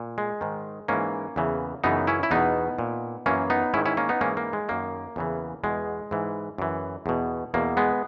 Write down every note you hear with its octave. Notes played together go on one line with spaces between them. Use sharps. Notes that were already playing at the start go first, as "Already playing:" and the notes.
Already playing: A#2
G#3
G#2 D#3
G#2 E3 A#3 C#4
E2 C#3 E3
F#2 C#3 E3 B3 D#4
C#4 E4
E4
E2 B2 B3 D#4
A#2
F#2 E3 A#3 C#4
B3 D#4
G#2 D#3 C#4 E4
C#4 E4
A#3 C#4
B3 D#4
G#2 E3 A#3 C#4
A#3
G#3
F#2 D#3 A#3
E2 C#3 E3
E2 B2 G#3
G#2 E3
F#2 E3
E2 B2
E2 B2 A#3
G#3 B3